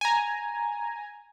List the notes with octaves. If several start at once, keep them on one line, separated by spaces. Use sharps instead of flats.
G#5 A#5